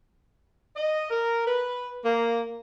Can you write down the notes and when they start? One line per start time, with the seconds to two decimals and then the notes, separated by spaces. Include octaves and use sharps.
0.75 D#5
1.10 A#4
1.46 B4
2.04 A#3